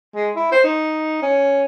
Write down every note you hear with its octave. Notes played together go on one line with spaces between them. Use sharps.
G#3
E4
C5
D#4
C#4